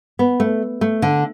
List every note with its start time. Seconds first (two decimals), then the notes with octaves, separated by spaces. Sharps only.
0.19 B3
0.40 A3
0.81 A3
1.02 D3